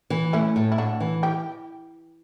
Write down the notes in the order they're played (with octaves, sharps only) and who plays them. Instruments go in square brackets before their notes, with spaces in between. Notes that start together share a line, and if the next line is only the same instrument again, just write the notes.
[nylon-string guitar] E3
[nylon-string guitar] A3 [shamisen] C#4 E4
[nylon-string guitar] A2
[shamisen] E4
[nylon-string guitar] A2 [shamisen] D4 F#4
[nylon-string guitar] E3
[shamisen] G4